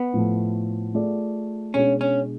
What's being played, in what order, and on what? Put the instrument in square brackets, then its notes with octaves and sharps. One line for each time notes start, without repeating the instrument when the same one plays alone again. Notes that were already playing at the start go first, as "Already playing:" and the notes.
Already playing: [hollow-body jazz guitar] B3
[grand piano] A2 F3 A3
A3 F4 G#4 D5
[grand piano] B2 G#3 D4 G#4 [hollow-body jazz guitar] C#4
[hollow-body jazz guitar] C#4